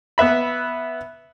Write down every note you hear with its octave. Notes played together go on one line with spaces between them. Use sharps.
B3 B4 E5 B5